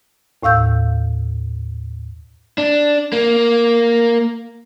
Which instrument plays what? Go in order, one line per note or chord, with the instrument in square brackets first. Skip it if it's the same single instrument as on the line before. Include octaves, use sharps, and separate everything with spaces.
[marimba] D#2 A2 F5 E6 G6
[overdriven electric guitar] D4
A#3